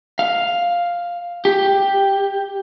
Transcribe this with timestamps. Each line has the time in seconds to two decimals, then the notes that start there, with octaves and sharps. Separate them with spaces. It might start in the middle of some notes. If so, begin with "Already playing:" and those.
0.19 F5
1.45 G4